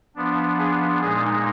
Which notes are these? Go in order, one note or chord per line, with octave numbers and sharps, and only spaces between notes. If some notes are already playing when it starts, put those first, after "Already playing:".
F3 B3 D4
G#4
A#2 G#3 D#4 G#4